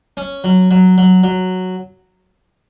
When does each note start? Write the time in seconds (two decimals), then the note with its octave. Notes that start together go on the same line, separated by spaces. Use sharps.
0.17 C#4
0.44 F#3
0.71 F#3
0.98 F#3
1.23 F#3